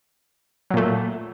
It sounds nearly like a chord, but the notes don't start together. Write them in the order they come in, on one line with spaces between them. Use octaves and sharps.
F#3 A#2 A3